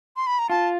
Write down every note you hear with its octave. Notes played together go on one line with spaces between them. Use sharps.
C6
B5
A#5
F4 A5